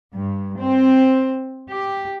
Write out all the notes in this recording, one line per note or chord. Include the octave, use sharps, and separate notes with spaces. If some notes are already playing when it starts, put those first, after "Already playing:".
G2
C4
G4